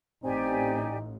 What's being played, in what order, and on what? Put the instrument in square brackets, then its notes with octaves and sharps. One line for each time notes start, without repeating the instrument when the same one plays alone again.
[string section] A1 [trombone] C4 [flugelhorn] D#4 [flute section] G4 D5 G#5